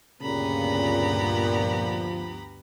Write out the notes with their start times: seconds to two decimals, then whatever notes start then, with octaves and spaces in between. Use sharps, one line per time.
0.22 D2 G2 A#2 C#3 B3 G4 A#5 B5
1.59 F3